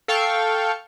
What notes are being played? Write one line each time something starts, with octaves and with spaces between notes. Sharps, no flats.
A4 F5 G5 C#6